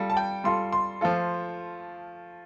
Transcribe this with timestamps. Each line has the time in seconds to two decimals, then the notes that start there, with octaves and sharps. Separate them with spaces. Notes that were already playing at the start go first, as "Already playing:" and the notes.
Already playing: G3 F4 A4
0.10 A5
0.17 G5
0.44 G3 F4 A4 C6
0.73 C6
1.01 F3 A3 F4 A4